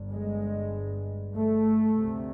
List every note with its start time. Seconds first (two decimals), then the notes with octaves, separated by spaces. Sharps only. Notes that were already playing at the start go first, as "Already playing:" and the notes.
Already playing: G1 G2
0.12 G#3
1.35 A3
1.96 D2 C3